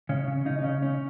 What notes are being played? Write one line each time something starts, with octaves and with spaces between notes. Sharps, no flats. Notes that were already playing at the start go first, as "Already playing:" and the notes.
C#3 C#4
C#3
C#3 D#4
D#4
C#3 C#4
C#4